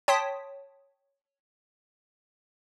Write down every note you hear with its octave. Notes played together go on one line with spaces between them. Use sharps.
C#5 G5 A5 C6 D#6 B6